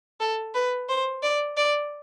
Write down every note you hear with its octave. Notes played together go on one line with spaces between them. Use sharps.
A4
B4
C5
D5
D5